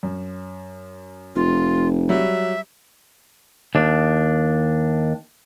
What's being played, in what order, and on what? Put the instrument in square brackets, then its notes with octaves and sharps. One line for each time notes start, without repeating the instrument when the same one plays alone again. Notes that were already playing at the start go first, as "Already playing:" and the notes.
[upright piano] F#2
[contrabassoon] F1 [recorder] F4
[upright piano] F#3 G3 [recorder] E5
[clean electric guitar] D#2 D4